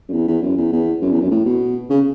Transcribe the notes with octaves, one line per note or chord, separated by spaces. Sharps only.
F#2
E2
E2
F#2
E2
E2
F#2
E2
F#2
A2
B2
C#3